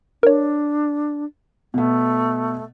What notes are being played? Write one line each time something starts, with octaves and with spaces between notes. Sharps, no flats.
D4 A#4 C#5
B2 A3 B3